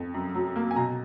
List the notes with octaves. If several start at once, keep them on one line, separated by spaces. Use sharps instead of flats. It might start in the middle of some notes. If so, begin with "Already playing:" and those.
Already playing: F2
F#2
F#3
A#3
G#5
B2 A#5